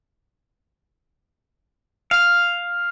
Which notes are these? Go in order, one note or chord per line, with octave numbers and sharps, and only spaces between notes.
F5